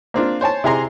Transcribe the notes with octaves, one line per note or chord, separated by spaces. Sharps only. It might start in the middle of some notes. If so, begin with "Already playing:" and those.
A#3 C4 D4 F4
C5 C#5 G#5 A5
C3 E4 G#4 G#5 A#5 C6